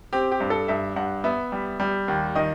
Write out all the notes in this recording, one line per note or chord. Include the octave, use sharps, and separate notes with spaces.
C4 G4
G4
G2
A4
G2 E5
G2 F#5
B3 E5
G3
G3
D#2
D#3 D#5